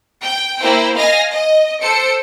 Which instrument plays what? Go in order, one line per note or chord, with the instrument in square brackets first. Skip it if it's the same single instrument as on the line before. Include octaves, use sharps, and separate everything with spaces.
[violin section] G5
A#3 E4 C5 G5
D#5 F5 G#5 A#6
D#5
A4 C5 C#7 D7